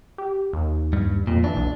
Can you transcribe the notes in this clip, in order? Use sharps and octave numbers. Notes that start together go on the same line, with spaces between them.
G4
D#2
G2
F2 A#2
E3 D4
B1